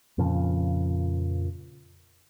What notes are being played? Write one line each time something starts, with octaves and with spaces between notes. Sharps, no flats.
F2 A#2 C#3 F3